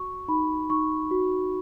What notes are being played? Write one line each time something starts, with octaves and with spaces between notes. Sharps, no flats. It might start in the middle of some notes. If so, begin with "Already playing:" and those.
Already playing: F#4 C#6
D#4 B5
D#4 C#6
F#4